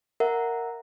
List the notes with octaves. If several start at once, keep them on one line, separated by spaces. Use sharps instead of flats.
A#4 E5 F#5